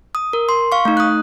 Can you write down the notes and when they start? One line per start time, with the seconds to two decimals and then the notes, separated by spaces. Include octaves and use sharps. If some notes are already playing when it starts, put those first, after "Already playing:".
0.15 D#6
0.33 A#4
0.49 C6
0.72 F5 C#6
0.85 A3 D#4
0.97 D#6 F#6